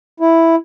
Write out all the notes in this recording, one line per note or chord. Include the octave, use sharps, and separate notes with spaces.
E4